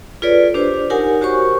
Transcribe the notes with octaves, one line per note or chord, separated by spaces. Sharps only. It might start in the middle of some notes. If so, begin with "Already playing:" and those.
F4 G#4 A4 B4 C#5 D5
D4 G4 C5
D#4 G4 A#4 C#5 F#5 G#5
F#4 G4 C5 C#5 C#6